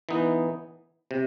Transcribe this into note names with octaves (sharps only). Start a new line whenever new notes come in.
E3 B3 D#4
C3